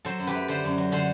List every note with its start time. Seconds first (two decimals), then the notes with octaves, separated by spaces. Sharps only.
0.05 F#3 A4 C5
0.19 F#2
0.27 G4 B4
0.35 A3
0.48 D3 A4 C5
0.64 F#2
0.78 F#3
0.92 D3 A4 C5